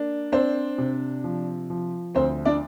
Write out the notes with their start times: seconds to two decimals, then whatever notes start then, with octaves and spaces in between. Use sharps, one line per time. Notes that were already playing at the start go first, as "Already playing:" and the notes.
Already playing: A#3 D4
0.32 C4 D4 C5
0.78 C3
1.24 F3
1.70 F3
2.15 D2 C4 C5
2.45 D4 D5